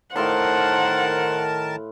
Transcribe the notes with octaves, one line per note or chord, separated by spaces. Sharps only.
A2 D#3 A#4 C5 F5 F#5 A5 C6